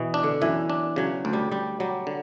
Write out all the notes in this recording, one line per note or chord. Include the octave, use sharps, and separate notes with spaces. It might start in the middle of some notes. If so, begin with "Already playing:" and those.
Already playing: B2 E3
D4
D3
F#2 E3
D4
C#3 F#3
D2
G3
D2 G3
F#3 G3
D3